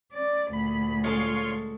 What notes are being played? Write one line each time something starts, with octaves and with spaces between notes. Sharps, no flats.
C#4 D5
D2 A#2 B5
G#3 C#4 F4 A4 C#5 C6